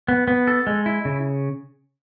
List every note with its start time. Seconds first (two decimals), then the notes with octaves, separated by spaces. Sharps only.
0.08 B3
0.28 B3
0.47 A4
0.67 G#3
0.86 E4
1.05 C#3